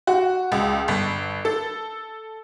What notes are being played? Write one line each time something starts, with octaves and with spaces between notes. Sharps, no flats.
F#4
C#2
G1
A4